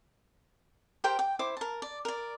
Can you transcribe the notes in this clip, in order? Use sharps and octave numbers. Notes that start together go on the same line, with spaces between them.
G4 A#4 C5 G5
G5
E4 C5 D6
A#4 A5
D5
A#4 D5